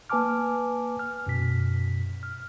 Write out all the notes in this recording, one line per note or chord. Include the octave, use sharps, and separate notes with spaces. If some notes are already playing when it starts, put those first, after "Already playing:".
A#3 B4 G#5 A5 D6 F6
F6
F#2 B2 B6
F6